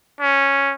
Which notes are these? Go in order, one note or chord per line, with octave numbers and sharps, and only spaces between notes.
C#4